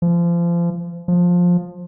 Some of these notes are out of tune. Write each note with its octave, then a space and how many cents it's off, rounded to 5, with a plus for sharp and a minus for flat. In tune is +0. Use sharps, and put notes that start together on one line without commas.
F3 -30
F3 +15